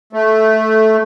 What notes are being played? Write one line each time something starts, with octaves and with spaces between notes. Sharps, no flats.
A3